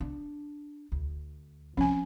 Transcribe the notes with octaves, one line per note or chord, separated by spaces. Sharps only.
D4
D2
F3 C4 C#4 G#5